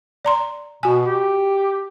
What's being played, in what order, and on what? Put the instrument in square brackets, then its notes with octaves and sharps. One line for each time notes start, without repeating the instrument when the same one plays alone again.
[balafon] D5 A#5 C6
[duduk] B2 [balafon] F#4 G#5
[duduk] G4